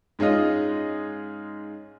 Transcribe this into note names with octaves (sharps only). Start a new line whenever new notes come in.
G#2 G#3 C#4 F4 D#5